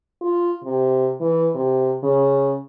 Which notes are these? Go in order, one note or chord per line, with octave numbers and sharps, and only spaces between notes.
F4
C3
E3
C3
C#3